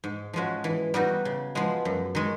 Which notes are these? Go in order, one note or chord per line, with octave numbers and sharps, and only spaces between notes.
G#2
F3 G#3 C#4 F#4
E3
G3 B3 D#4 F#4
C#3
F3 G#3 B3
F#2
D#3 G#3